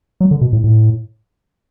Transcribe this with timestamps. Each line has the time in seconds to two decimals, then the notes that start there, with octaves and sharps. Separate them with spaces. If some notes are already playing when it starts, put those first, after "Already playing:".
0.21 F#3
0.31 D3
0.41 B2
0.53 A2
0.64 A2